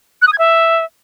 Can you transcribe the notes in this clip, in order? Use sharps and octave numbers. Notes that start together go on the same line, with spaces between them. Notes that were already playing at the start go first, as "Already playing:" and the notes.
F#6
D#6
G#6
E5